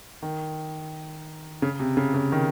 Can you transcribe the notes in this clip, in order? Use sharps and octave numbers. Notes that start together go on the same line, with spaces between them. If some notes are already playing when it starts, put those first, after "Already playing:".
D#3
C#3
C3
C#3
C#3
D#3